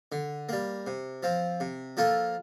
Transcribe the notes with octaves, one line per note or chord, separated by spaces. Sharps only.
D3
G3 A#3
C3
F3 C4
C3
F3 A#3 F4 A4